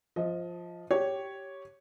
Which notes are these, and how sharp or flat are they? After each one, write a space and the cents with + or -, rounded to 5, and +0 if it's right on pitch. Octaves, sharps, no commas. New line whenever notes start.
F3 +0 D#5 +20
G4 -10 C#5 +0